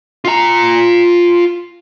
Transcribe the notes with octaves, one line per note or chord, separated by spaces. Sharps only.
F4 A#5